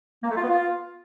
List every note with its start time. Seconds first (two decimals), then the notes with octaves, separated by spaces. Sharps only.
0.23 A#3
0.30 A3
0.37 F4
0.43 B3
0.50 F4